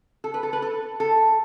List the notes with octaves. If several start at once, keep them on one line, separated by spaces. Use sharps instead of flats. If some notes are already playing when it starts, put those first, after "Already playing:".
A4
B4
A4
B4
A4
A4